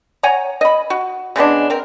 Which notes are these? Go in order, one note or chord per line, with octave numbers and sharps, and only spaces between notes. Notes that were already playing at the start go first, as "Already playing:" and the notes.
C#5 F#5 G#5 A#5
D#5 B5
F#4
C#3 G#3 B3 D4
C4 A#4